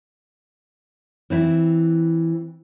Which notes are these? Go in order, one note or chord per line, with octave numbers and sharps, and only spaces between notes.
E3 C4 E4